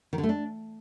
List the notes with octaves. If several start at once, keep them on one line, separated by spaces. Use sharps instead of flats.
D#3
D3
A3
D4